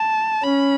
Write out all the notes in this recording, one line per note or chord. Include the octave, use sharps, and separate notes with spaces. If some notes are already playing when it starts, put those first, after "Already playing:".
Already playing: A5
C#4 B5